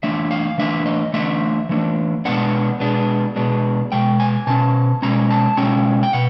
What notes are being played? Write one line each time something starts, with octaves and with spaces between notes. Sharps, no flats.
E3 A3 D4 E5
F5
E3 A3 D4 E5
D#5
E3 A3 D4 E5
E3 A3 D4
B2 G#3 B3 D4 F#5
B2 G#3 B3 D4
B2 G#3 B3 D4
B2 G#3 G5
G#5
B2 G#3 C#4 A5
B2 G#3 C#4 A#5
A5
B2 G#3 C#4 G5
G5
B2 F#5